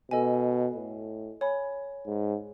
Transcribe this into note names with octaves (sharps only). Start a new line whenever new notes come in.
B2 A4 D#5 G#5
A2
C#5 G#5 B5
G#2